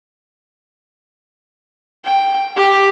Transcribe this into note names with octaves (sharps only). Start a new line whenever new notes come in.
G5
G4